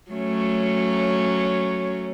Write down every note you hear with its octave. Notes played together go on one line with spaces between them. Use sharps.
F#3 A3 C#4